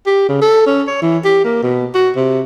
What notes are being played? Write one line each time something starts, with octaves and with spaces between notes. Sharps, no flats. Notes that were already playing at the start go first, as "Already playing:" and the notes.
G4
C#3
A4
C#4
C#5
E3
G4
A#3
B2
F#4
C3